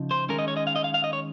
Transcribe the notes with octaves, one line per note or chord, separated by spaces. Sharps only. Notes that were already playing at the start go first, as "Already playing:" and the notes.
Already playing: C#3 F3 D#4
C5
D#3 G#3 C#4 A#4
D#5
C#5
D#5
F5
D#5
F5
F5
D#5
C#5